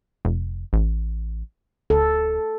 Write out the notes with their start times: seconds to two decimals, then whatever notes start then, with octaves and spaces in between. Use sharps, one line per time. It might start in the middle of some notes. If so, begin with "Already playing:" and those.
0.25 F1
0.73 A1
1.90 D1 A4